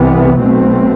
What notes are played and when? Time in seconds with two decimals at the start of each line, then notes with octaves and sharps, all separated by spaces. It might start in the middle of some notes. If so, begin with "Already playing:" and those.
Already playing: C2 C3 E3 B3
0.40 B1 B2 A3 C4